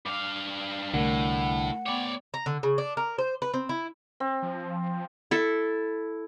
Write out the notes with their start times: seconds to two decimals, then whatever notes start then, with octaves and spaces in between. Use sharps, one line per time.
0.05 G2 F5 D6
0.94 C2 A2 D3 A3 A#4 F#5
1.86 B3 C#5 D5 G5 D6
2.34 A#5
2.46 D3
2.63 C#3
2.78 D4
2.97 A#4
3.18 C5
3.42 B4
3.54 C4
3.69 E4
4.20 C4
4.42 F3
5.31 E4 A4